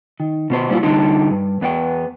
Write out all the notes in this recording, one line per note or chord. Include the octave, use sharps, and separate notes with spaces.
D#3
B2 B3 C5
A#2 G3 G#3 E4 F4
D3 G3 D#4 G4
G2
E2 B3 D4 G5